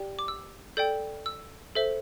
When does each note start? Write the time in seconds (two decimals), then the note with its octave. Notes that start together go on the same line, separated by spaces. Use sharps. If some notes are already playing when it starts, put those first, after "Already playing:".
Already playing: G4 D5 G5
0.19 D6
0.28 E6
0.77 A4 D5 G5 G6
1.26 E6
1.75 A4 C5 E5